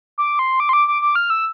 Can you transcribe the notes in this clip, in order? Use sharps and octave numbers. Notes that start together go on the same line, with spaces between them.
D6
C6
D6
C6
D6
D6
D6
F6
E6